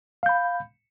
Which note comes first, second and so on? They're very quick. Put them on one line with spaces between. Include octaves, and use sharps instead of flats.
F5 G6 B5